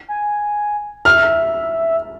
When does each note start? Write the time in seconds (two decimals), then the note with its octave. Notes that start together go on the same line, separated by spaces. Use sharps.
0.08 G#5
1.05 E5 F6